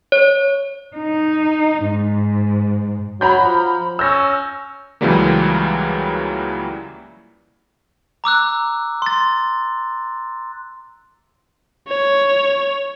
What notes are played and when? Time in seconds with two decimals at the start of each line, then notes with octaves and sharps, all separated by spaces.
0.12 C#5
0.96 D#4
1.84 G#2
3.21 F#3 A#5 B5 G6
3.40 F3
3.99 C#4 E6 G6 A#6
5.01 C#2 C#3 E3 F#3 G3 A#3
8.24 A#5 D6 E6 F#6
9.02 C6 A6
11.88 C#5